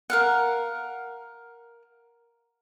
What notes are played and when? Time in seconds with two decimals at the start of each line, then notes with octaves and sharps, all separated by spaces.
0.10 A#4 F5 F#5